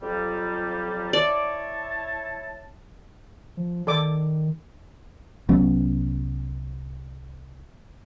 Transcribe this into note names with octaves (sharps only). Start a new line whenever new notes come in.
F2 F#3 G3
E4 C#5 D5 A5
F3
D#3 A4 D5 D6
C2 F#3 B3 C#4